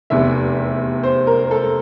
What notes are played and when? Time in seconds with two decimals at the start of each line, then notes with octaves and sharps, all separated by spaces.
0.10 F1 E2 C3 E5
1.03 C5
1.27 A#4
1.51 A4